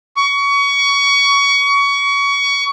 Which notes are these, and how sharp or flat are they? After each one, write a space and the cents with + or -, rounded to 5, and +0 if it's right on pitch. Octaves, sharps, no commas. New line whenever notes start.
C#6 +25